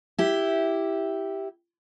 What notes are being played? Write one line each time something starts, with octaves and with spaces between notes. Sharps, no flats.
E4 G4